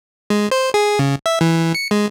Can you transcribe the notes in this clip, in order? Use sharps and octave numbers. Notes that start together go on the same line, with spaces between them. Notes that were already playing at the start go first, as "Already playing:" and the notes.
G#3
C5
G#4
C#3
E5
E3
C#7
G#3